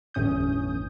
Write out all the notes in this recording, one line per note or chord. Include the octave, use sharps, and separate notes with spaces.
G1 E2 A2 C#4 D#6 G6